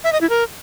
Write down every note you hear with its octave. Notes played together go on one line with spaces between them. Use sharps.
E5
D#5
E4
A#4